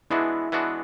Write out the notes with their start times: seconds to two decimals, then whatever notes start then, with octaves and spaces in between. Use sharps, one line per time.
0.10 E3 G#3 B3 D4 E4 F#4
0.52 E3 G#3 B3 D4 F#4